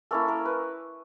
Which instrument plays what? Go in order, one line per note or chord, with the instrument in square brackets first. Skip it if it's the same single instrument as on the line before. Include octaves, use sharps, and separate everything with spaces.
[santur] A#3 C#4 E4 A4
A#4
B4